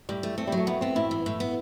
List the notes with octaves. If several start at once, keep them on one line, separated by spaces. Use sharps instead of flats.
A2 G3
A3
A3 C4
G3
F#3 A3
A2 B3
B3 C4
A2 E4
E3
A2
B3